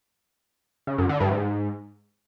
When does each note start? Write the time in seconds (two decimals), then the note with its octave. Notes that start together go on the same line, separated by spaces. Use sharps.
0.87 C#3
0.98 F#2
1.09 D3
1.20 G2
1.31 G#2